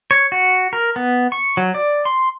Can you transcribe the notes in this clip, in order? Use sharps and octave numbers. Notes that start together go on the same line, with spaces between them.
C#5
F#4
A#4
B3
C#6
F#3
D5
C6